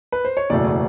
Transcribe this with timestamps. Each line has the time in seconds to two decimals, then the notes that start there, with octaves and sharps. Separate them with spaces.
0.12 B4
0.25 C5
0.37 C#5
0.50 F#1 E2 B2 F#3 A3 D5